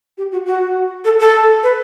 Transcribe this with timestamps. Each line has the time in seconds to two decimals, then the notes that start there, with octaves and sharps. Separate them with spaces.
0.18 G4
0.32 F#4
0.46 F#4
1.05 A4
1.20 A4
1.63 B4